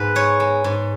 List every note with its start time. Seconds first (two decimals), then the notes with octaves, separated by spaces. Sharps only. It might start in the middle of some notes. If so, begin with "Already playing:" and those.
Already playing: G#2 B3 B4
0.15 G#3 C#5
0.40 G#3
0.64 G#2